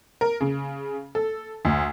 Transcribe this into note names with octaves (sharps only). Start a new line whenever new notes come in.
A#4
C#3
A4
D2